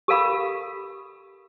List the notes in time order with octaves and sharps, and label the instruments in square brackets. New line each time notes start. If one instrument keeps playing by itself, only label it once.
[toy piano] G4 A4 A#4 F5 B5